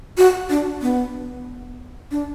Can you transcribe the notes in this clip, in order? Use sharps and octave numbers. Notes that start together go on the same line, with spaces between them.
F#4
D4
B3
D4